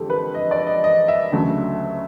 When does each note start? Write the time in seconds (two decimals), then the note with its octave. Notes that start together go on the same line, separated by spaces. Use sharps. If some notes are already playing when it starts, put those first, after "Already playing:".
Already playing: F2 D3 F3 G#3 G4 A4
0.10 B4
0.35 D#5
0.51 D5
0.67 D#5
0.84 D#5
1.08 E5
1.32 D2 C#3 F#3 A3